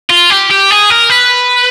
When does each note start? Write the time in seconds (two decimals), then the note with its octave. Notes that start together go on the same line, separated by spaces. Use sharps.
0.10 F4
0.30 G4
0.50 G4
0.70 G#4
0.90 A#4
1.10 B4